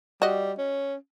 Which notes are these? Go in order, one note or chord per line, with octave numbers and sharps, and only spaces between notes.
G3 F#4 D#5
C#4